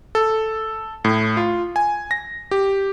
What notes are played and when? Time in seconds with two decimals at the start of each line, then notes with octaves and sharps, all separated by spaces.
0.15 A4
1.05 A2
1.37 F4
1.76 G#5
2.11 A#6
2.51 G4